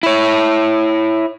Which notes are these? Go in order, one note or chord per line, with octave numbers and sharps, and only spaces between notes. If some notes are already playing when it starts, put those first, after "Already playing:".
E4 C#5